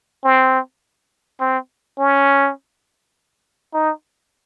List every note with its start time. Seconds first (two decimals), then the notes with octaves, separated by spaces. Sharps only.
0.24 C4
1.40 C4
1.99 C#4
3.74 D#4